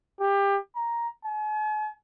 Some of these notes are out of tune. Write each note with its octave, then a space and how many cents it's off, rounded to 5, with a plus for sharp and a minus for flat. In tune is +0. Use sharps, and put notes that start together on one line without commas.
G4 +25
A#5 +5
G#5 +45